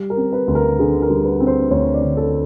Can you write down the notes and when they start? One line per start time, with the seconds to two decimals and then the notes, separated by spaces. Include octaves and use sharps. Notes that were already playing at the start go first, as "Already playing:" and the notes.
Already playing: G3
0.10 A#4
0.17 C4
0.33 B4
0.47 D2
0.55 A#4
0.79 D3 G#4
1.02 A#4
1.10 G3
1.25 B4
1.40 C4
1.47 C5
1.70 D2 C#5
1.94 D5
2.02 D3
2.17 A4